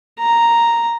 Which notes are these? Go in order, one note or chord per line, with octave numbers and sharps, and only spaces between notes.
A#5